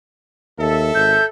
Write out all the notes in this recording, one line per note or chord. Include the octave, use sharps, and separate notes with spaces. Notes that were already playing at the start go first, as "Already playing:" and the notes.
D#2 A4 E5
G#1 G6